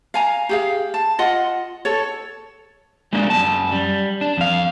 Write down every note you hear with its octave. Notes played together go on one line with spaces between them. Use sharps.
F5 G#5 A#5
G4 G#4 F5
A5
F4 D#5 F#5
A4 C#5
G3 G#3 A#3 D4
F#2 A5
G3
D4
F2 F5